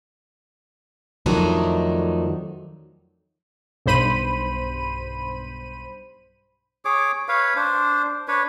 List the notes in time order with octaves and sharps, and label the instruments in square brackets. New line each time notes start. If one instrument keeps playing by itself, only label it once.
[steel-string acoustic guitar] F2 D#3 F#3 A3 D4 D#4
[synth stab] B1 G2 C5 B5 D#7
[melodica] G#4 C#5 D6
B4 C#5 F5
D4 C5
D4 B4 C#5